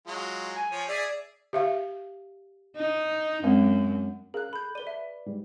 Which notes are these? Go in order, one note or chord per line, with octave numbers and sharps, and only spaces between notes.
F#3 G#3 F4
G#5
F3 C#5
G#4 D5 E5
G4 E5 F5
D#4
F#2 G#3 C4
C#4 G#4 A#4 F5 F#6
A4 B5 G6
B4 D5 D#7 G7
E5
G#2 G3